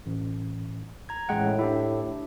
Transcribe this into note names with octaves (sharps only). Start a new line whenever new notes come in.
A1
A#5 G#6
A1 A2 G#3 F#5 G5
D4 E4 G4 E5